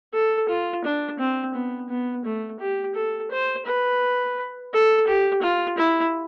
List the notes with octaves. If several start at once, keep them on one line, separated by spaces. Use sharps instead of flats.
A4
F4
D4
C4
B3
B3
A3
G4
A4
C5
B4
A4
G4
F4
E4